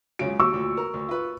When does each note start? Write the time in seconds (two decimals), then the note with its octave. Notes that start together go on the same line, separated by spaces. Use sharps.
0.19 C#2 C#3 F#3 D7
0.40 D#2 F#4 C#6 E6
0.51 D2 A#2
0.77 A#4
0.94 D2
1.09 F4 B4